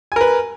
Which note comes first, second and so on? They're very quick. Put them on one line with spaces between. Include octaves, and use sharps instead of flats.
G#5 A#4 B4